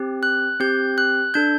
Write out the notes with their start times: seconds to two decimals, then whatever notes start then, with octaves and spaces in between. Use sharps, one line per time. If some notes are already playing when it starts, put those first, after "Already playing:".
Already playing: C4 G4
0.23 F#6
0.60 C4 G4 G6
0.98 F#6
1.34 D4 A4 G6